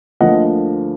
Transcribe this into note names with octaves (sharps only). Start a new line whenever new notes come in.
D2 D3 F3 A#3 D#5 F#5